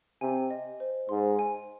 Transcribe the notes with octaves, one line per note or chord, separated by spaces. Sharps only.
C3 G#5
D#5
C5
G#2 C6
G#5